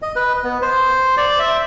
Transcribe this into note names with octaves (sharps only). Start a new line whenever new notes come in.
D#5
B4
B3
C5
D5
E5